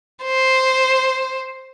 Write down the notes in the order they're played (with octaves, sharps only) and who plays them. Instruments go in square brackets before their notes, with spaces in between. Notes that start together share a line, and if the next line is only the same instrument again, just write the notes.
[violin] C5